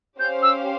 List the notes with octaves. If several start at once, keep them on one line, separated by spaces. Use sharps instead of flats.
C#4 G4 C5 F5 G6
E6